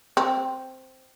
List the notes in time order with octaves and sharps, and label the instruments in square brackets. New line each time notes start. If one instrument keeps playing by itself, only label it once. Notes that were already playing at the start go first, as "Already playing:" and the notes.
[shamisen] C4